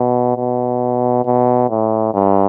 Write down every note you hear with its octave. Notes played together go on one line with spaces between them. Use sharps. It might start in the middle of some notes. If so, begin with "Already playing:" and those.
Already playing: B2
B2
B2
A2
G2